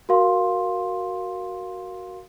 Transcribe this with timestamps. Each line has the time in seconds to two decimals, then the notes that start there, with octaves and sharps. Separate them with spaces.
0.09 F#4 A#4 F5 C6